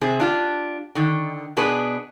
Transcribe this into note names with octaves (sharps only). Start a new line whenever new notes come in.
C3 C4 G#4
D4 F4 G4
D3 D#3
B2 B3 D4 G#4 B4